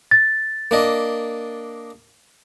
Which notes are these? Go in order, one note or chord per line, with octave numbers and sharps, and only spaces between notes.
A6
A#3 D4 D#5